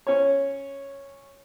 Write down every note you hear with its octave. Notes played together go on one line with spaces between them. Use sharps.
C#4 C#5